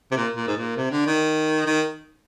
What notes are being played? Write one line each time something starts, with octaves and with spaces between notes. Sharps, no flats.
C3
A#2
A#2
G#2
A#2
C3
D3
D#3
D#3